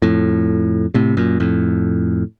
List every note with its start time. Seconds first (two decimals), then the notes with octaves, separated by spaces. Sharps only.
0.02 F2 A2
0.94 A2 C3
1.17 F#2 A#2
1.40 F2 A2